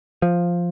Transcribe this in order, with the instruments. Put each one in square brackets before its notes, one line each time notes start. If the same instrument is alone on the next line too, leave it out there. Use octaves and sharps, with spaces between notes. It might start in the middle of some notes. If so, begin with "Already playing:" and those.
[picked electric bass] F3